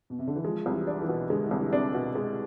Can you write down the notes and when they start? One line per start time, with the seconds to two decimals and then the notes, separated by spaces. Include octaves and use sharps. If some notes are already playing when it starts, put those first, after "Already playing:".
0.10 B2
0.19 C3
0.27 D3
0.36 E3
0.44 F3 G#3
0.66 C2
0.73 E3
0.87 D4
1.01 E3
1.08 B2
1.30 D3 G#3
1.46 E3
1.51 C2
1.60 D3
1.73 C3 D4
1.94 B2
2.15 G#3